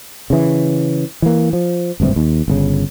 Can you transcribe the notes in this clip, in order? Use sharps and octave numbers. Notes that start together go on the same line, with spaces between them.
C#3 E3
E3 A#3
F3
G#1 D2 G2 C3
D#2
G1 A#2 C#3